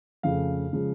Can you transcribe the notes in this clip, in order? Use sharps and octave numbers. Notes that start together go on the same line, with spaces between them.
F2 C#3 F3 A3 F5
C#3 F3 G#3